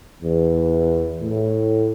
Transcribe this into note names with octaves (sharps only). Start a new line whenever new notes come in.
E2
A2